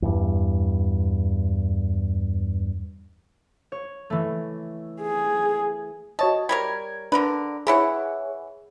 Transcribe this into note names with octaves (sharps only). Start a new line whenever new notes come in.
E2 G2
C#5
E3 A3
G#4
F#4 C#5 D#5 A5
G3 A#4 C#5 G#6
D3 D4 A#4 B4
E3 E4 G#4 C#5 F#5